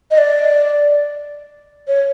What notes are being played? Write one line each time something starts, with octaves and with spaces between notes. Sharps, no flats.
D#5
D5
C#5